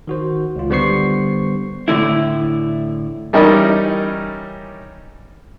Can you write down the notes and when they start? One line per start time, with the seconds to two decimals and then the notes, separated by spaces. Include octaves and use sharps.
0.07 D#3 F#4 C5
0.56 C#2 F4
0.70 D3 G3 B3 C5 C#6 C7
1.88 A2 D3 A3 E4
3.33 E3 G3 C#4 D#4 A#4 D5